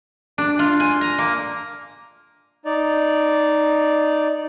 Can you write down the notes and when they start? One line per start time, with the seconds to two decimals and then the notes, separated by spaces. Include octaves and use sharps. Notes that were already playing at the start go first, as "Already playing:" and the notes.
0.38 D4
0.59 F4
0.80 G#5
1.01 A#5
1.19 A#3
2.65 D#4 D5